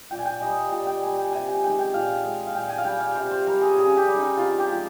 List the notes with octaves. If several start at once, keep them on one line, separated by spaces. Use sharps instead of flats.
A#2 G5
G#5
G5
G3 D#5
A#2 G5
G5
G3 G#5
G5
C3 G#5
G5
D#3 G#3 G5
G5
A#2 F5
G#3
F5
A#2 G5
G#5
F5
G3 G5
F5
C3 C5
C5
G3 A#4
G#4
C#3 G#4
G4
G3
D#4
C3 F4
G4
F3 G#3